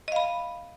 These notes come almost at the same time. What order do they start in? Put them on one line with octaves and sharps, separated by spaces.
D#5 F5 B5